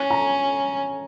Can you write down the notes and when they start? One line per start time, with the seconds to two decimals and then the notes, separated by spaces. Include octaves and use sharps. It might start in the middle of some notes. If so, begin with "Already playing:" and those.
Already playing: C#4 G#5
0.10 A#5